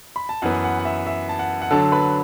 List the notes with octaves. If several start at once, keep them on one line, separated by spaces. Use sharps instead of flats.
B5
A5
F#2 E3 B3 F#5
F#5
F#5
E5
E5
A5
F#5
F#5
D3 F#3 D4 A4 A5
B4 B5